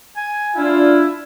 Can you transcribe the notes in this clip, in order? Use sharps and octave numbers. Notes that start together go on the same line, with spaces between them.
G#5
D4 E4 F4